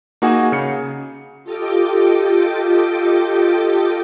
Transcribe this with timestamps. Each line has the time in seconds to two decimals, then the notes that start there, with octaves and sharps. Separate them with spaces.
0.22 A#3 D#4 F#4 G#4 F#5 G#5
0.52 C#3 C#7
1.44 F4 G4 A4 D#5 G5 D6